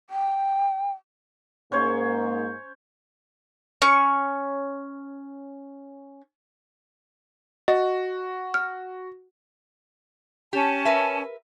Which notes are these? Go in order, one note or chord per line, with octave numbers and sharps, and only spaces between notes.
G5
G#2 A#3 C#4 C5 C#5
C#4 C#6
F#4 D#5
F6
C#4 G4 A5
A#4 B4 E5